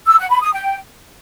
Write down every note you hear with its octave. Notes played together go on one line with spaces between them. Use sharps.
E6
F#5
B5
D#6
G5